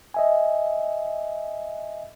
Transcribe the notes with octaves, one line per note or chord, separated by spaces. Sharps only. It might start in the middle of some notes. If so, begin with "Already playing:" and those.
D#5 E5 G#5